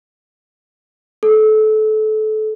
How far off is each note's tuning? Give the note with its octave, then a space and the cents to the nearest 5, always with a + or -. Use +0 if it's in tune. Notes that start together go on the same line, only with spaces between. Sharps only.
A4 -25